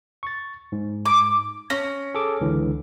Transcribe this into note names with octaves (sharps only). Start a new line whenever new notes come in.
C#6 A6
G#2
D6
C#4 A#6
G#4 A4 D6
C#2 D3 E3